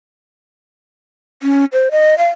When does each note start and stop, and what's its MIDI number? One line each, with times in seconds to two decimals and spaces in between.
1.43 1.65 61
1.72 1.89 72
1.91 2.17 75
2.18 2.29 77